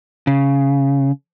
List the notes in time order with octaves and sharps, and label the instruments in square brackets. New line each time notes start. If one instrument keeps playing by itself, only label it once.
[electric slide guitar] C#3